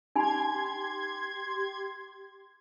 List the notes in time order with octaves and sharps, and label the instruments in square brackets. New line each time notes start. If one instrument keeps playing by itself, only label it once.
[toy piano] D#4 G#5 B5 [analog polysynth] G4 C6 G#6